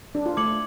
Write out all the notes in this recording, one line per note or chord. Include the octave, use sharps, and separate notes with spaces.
D4
F4
A3 D6 G#6 C#7 F#7